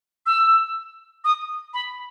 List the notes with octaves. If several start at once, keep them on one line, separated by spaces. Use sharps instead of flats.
E6
D#6
B5